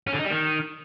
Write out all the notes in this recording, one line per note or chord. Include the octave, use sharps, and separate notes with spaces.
C#4
D3
D#4
G3
D#3